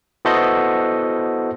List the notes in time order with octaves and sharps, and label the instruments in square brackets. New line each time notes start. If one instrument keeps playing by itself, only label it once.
[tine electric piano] B3 E4 F#4 A4 C5 D#5